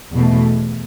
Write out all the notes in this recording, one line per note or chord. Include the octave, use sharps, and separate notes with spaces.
E2 B2 A3